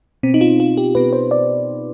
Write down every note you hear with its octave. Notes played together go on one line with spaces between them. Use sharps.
B2 B3 C4
D#4
F4
F4
G4
B2 B3 B4
C5
D5